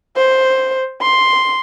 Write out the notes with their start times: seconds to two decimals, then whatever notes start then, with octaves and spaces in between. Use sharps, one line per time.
0.17 C5
1.01 C6